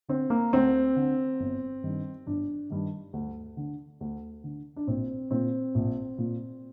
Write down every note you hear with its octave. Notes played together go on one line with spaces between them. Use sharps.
D3 C4
A#3
D2 C4
D3
G1
G2 D#3
G1 D4
G2 D#3
D2
D3
D2
D3
D4
A#1 C4
A#2 C4
A#1
A#2